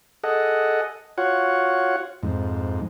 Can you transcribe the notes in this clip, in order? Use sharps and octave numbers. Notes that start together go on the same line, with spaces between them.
G#4 A4 D#5 F#5
F4 F#4 C#5 F#5
F2 G#2